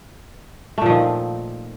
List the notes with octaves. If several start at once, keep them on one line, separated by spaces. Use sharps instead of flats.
A#2 D#3 F3 A3